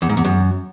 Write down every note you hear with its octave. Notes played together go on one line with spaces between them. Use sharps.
E2
G#2
E2
F#2